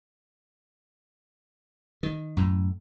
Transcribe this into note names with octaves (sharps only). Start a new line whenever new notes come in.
D#3
F#2 A2